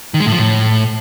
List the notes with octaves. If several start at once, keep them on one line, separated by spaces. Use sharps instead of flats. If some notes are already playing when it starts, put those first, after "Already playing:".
D#3
G#3
A2
F3
A2